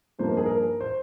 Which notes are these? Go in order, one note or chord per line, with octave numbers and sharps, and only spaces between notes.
G2 F3 A#3 D#4 C5
A#4
G#4
A#4
C5